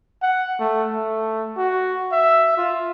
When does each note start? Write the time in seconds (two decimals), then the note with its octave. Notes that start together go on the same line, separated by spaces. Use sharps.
0.22 F#5
0.59 A3
0.93 A3
1.57 F#4
2.12 E5
2.58 F4